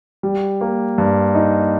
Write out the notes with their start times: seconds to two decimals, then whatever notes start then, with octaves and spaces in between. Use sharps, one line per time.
0.23 G3
0.61 A#3
0.98 G2
1.35 D#4